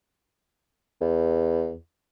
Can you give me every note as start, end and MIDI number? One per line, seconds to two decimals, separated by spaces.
1.01 1.76 40